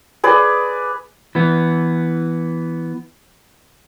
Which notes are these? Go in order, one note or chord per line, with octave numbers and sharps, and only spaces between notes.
G#4 B4 D5
E3 B3